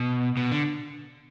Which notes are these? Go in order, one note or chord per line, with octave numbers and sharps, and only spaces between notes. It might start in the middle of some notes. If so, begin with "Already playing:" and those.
Already playing: B2
B2
D3